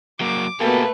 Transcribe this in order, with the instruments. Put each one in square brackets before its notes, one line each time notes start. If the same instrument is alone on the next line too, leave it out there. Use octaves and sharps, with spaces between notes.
[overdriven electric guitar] F#3 A#3 [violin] D6
[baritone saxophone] B2 [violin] A3 B4 [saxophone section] A#3 [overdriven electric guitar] G4 A4